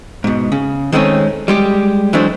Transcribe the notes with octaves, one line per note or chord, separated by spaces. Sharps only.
G#2 B2
C#3
D#3 G#3 A3 C4 C#4
G3 G#3 G4
E3 F#3 G#3 A3 D4 C5